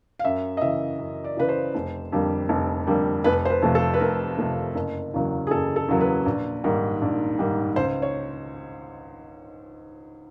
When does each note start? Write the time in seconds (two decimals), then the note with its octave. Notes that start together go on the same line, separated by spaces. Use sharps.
0.19 F5
0.24 F#2 E5
0.57 D#5
0.61 C#3 E3 E5
0.99 F#2
1.24 D5
1.37 C#3 E3 B4
1.49 C5
1.75 F1
2.12 F2 D3 G3 A#3
2.49 F1
2.87 F2 D3 G3 A#3
3.24 F1 B4
3.45 C5
3.50 B4
3.62 F2 C3 F3 A3
3.75 A4
3.94 B4
4.00 F1 A#4
4.38 F2 C3 F3 A3
4.75 F#1
5.14 E2 C#3 F#3 A#3
5.47 G#4
5.50 F#1 A4
5.76 A4
5.88 E2 C#3 F#3 A#3
6.01 B4
6.25 A#1
6.64 G#2 D#3 G3 A#3
7.01 A#1
7.39 G#2 D#3 G3 A#3
7.76 C#2 C5
8.02 C#5